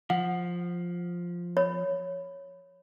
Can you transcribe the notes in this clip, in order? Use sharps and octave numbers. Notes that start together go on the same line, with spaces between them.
F3 F#5
C#5 B5